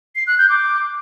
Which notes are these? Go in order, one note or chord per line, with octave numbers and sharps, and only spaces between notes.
C7
F#6
G6
D6